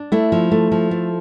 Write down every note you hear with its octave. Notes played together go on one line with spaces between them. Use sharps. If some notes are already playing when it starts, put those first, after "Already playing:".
Already playing: D4
A3 E4
F3
A3
F3
A3